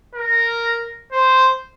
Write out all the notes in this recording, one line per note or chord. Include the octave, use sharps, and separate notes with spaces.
A#4
C5